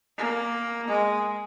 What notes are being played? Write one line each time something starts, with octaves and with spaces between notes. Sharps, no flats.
A#3
G#3